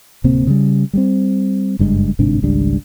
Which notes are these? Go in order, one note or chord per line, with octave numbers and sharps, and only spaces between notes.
D1 C3 A#3 C4
C#3 G3
G3 G#3 C4
F#1 G2 D#3 G#3
G1 G#2 C3 D4
G#1 C#2 G3 D4